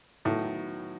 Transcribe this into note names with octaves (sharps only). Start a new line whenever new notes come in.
A2 D#3 F#3 B3 D#4 F#4